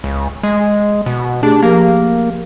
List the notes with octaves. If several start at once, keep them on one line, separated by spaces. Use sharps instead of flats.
C#2
G#3
B2
A3 D4 G4 G#4
F3 A#3 G4 A#4